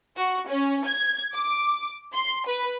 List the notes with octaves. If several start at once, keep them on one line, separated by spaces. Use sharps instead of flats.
F#4
C#4
G#6
D6
C6
B4